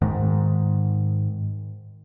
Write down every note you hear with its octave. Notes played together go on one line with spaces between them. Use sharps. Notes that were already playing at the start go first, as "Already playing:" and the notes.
G#2 D#3